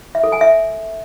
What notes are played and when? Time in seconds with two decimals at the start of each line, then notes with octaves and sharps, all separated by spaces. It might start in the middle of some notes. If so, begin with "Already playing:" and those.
0.15 E5
0.24 A4
0.32 G#5
0.41 E5